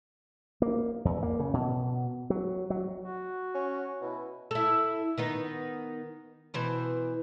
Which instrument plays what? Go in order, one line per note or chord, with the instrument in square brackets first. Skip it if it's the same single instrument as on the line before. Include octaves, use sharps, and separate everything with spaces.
[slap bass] A#3
E2
A#3
C#3
B2
F#3
F#3
[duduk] F#4
[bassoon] C#4
[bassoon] B2 [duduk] E4
[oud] E4 A4
D#3 B3 D#4
B2 E3 C5